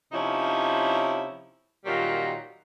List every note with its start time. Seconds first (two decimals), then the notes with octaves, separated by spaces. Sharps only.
0.12 C3 F3 C#4 D#4 E4
1.85 A#2 D#3 F#3 G3 F4 F#4